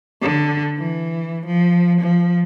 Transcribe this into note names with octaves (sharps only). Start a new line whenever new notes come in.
D3
E3
F3
F3